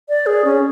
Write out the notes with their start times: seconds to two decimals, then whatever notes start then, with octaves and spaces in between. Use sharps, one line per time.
0.09 D5
0.26 G#4
0.45 C#4